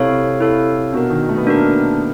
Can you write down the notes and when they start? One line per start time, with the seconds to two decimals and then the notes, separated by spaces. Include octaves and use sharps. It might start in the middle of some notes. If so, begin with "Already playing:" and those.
Already playing: C3 E4 A4 C#5 F5
0.40 E4 A4 C#5 F5
0.93 B2 D4 F#4 A#4
1.10 D#3
1.29 A3
1.37 B3
1.46 A#3 D4 F#4 A#4